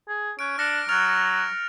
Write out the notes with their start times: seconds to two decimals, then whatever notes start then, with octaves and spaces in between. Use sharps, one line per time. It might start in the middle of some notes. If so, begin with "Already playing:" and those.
0.08 G#4
0.39 C#4 F#6 D7
0.58 D4 F6 A#6 C#7
0.89 F#3 F6 A6 F7